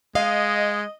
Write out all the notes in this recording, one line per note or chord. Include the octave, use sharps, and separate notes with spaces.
G#3 D#5 F5